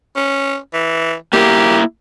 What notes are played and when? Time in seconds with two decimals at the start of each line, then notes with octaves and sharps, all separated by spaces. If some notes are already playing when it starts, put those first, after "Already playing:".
0.16 C#4
0.74 E3
1.33 A#3 E4 G4 A#4